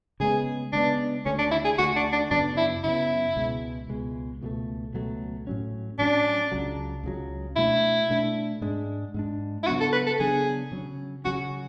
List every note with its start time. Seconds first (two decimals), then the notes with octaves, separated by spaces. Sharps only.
0.20 C#3 G#3 B3 G#4
0.73 C#3 G#3 B3 D4
1.26 D2 D3 A3 C#4
1.39 D4
1.52 E4
1.65 G#4
1.78 D2 D3 A3 F#4
1.96 D4
2.13 D4
2.31 F#2 C#3 F#3 B3 D4
2.57 E4
2.83 F#2 C#3 F#3 B3 E4
3.36 C#2 B2 G#3
3.88 C#2 B2 G#3
4.41 C#2 B2 F#3 A3
4.93 C#2 B2 F#3 A3
5.47 A2 F#3 C#4
5.98 A2 F#3 C#4 D4
6.52 C#2 C#3 F#3
7.04 C#2 C#3 F#3
7.56 B2 A3 D4 E4
8.10 B2 A3 D4
8.61 G#2 G#3 D4
9.14 G#2 G#3 D4
9.63 E4
9.67 C#3 F#3 B3 D4 F#4
9.81 A4
9.93 B4
10.07 A4
10.20 C#3 F#3 B3 D4 G#4
10.72 C#3 F#3 C#4
11.25 C#3 F#3 C#4 F#4